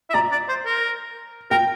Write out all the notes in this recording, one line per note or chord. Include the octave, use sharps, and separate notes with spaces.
E5
D5 A#5
D5
C5
A#4
A#4 G5